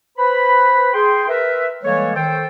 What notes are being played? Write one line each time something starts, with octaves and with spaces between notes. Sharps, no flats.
B4 C5 B5
G#4 G5 C6
A#4 B4 E5
E3 G3 G#3 A#3 A4 C#5
D#3 A4 C5 G5